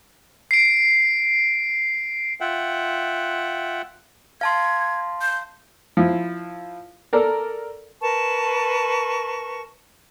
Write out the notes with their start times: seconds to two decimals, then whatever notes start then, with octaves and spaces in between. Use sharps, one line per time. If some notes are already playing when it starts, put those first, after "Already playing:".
0.51 C7 D7
2.41 F4 E5 F#5 G5
4.41 F5 A5 C6 G#6
5.21 G6
5.97 F3 E4
7.13 A4 A#4 D5
8.01 A#4 B4 A5 C#6